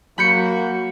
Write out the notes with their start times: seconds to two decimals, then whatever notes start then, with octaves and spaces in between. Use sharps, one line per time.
0.18 F#3 A#3 F#4 B5 G6 C#7